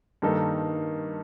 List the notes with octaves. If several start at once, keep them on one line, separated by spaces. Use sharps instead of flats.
G2 D#3 A#3 D#4 A4